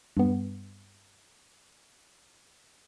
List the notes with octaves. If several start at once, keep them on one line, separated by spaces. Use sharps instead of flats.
G2 B3